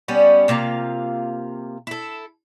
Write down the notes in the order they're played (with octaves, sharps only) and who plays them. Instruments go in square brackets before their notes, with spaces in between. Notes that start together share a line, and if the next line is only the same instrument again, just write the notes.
[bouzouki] G3 B3 C#4
C3 A#3 F4 F5
E4 A4